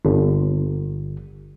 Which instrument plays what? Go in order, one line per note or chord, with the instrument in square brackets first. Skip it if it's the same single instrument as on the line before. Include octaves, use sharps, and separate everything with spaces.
[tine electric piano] G1